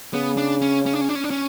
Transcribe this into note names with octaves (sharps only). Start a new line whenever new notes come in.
C#3 B3
D4
C#4
C#4
D4
C#4
D4
C#4
D4
C#4